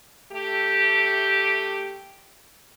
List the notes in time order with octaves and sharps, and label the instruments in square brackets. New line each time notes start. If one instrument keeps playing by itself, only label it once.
[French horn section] A3 G4